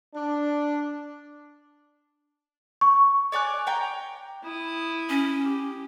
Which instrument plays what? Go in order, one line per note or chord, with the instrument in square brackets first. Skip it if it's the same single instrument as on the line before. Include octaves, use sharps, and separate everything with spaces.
[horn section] D4
[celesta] C#6
[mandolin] C#5 D5 G#5 F#6
C#5 G5 A#5
[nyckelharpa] E4 D#6
[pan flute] C#4
[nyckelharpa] G4